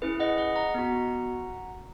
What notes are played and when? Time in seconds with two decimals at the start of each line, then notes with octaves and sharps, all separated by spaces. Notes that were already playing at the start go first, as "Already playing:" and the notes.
0.02 C#4 E4 G#4 B4
0.19 D#5 F#5
0.38 D#5 F#5
0.56 F#5 A#5
0.74 B3 F#4